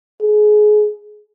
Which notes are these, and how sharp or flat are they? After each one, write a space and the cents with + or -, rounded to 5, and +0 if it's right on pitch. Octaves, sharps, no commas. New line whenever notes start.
G#4 +25